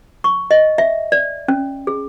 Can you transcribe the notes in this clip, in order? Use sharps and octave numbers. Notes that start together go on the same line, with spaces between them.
C#6
D#5
E5
D5
C#4
G#4